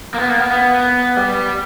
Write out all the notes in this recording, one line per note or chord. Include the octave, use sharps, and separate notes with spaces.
A#3
B3
A#3
B3
B3
G3